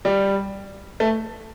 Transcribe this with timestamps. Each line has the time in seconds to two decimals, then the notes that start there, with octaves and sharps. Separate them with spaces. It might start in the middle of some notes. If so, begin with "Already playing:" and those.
0.05 G3
1.00 A3